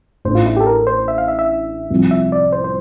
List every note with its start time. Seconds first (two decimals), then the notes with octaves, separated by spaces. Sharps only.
0.25 A1 A2 E3 A3 D4 C5
0.35 F4
0.46 E4
0.56 G4 A4
0.67 A#4
0.87 C5
1.08 E5
1.18 F5
1.28 E5
1.39 E5
1.90 C2 C3 F3 C4 F4
2.11 E5
2.32 D5
2.52 C5
2.64 C5